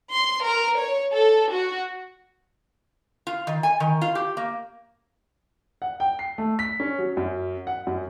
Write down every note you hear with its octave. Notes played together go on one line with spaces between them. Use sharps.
C6
A#4
C#5
A4
F#4
F4
D#3
G#5
D#3
F4
G4
A#3
F#5
G5
C7
A3
B6
C#4
F#3
F#2
F#5
F#2